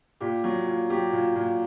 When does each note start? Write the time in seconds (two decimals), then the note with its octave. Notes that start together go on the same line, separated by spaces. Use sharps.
0.21 A#2 G4
0.44 F#3
0.67 A#2
0.90 F#3 G4
1.13 A#2
1.36 A#2